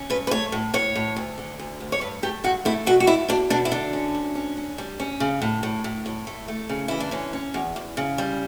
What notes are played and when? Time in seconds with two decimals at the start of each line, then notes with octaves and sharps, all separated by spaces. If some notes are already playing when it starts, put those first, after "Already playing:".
Already playing: C#4
0.10 G2 B4
0.27 B4
0.31 A3 C#5
0.52 A2
0.74 A2 C#5
0.95 A2
1.16 D2
1.38 D3
1.59 D2
1.80 D2
1.92 C#5
2.01 G2 B4
2.23 A3 G4
2.44 G2 F#4
2.65 A3 E4
2.86 B2 F#4
3.00 F#4
3.07 A3 E4
3.28 B2 D4
3.50 B2 D4
3.65 E4
3.72 D3 D4
3.93 C#4
4.15 D2
4.35 C#4
4.57 C#4
4.78 G3
5.00 C#4
5.20 C#3
5.42 A2
5.63 A2
5.84 A2
6.06 A2
6.27 A3
6.48 A3
6.69 C#3
6.88 E3 E4
7.00 D4
7.11 D3 C#4
7.33 C#4
7.54 E2
7.76 E2
7.97 C#3
8.18 G3